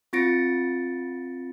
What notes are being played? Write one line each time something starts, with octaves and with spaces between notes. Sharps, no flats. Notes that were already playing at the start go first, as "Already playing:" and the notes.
C4 F4 A6 A#6 C#7 D7